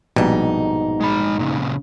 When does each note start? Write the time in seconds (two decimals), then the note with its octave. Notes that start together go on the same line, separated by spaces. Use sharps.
0.16 A#1 G#2 B2 G3 D#4
1.01 G#3 B5
1.39 A#2 C#3